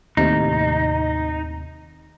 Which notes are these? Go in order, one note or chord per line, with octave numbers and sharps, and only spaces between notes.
D#2 A2 C3 D#4